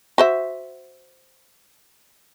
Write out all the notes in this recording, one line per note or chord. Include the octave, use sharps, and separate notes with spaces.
F#4 C5 E5